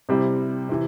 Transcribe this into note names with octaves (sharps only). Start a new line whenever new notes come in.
C3 G3 C4 E4
C3 E3